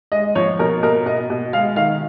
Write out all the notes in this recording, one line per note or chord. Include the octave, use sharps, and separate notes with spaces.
G#3 D#5
F3 C#5
B2 A#4
B2 A#4
B2 D#5
B2
G#3 F5
D#3 F5